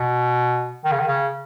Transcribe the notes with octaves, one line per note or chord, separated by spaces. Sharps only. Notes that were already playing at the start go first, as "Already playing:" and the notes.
Already playing: B2
D#3
C#3
D#3
C#3